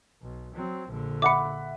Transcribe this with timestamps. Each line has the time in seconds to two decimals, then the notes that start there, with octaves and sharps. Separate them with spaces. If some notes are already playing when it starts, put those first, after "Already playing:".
0.22 B1
0.54 F#3 C4
0.89 A#1 D3
1.22 E5 F#5 B5 D6 C#7